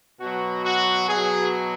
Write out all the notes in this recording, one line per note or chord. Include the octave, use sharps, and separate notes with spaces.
B2 F#3 F#4
F#4
B2 F#3 G#4